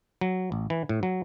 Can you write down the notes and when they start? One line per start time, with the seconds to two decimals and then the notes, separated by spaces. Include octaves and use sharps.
0.21 F#3
0.52 A1
0.70 E3
0.89 A2
1.03 F#3